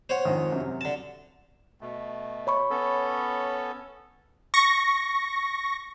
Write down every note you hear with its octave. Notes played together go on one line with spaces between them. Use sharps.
C5 C#5 F#5
F2 G#2 D#3
F#2 C3
D3 A5
B2 A3
C#5 B5 C#6
B3 C#4 A4
C#6 A#6